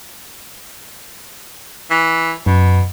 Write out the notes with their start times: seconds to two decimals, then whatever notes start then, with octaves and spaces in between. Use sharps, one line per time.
1.90 E3
2.46 F#2 B2